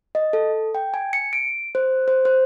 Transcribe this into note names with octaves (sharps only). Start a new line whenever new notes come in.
D#5
A4
G5
G#5
C#7
D7
C5
C5
C5